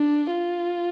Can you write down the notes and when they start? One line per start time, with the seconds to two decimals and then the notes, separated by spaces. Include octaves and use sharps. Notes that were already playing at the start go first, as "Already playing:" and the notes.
Already playing: D4
0.31 F4